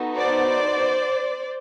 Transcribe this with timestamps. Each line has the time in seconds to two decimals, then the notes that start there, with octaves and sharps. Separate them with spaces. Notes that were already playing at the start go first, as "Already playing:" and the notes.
Already playing: B3 D#4 F#4 A4
0.17 C5 D5